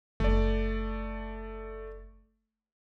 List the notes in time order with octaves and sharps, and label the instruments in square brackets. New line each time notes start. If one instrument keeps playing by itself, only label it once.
[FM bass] F#1 [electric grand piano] A3 D5